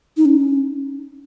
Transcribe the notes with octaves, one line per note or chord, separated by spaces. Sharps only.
D#4
C#4